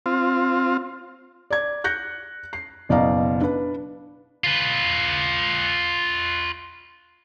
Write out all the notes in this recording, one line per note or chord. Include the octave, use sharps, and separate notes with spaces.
C4 F4
D5 G#6
F#6 G6 A#6 C#7
C7
F#1 B2 D5 D#5 F5 A#5
D4 B4
F4 B4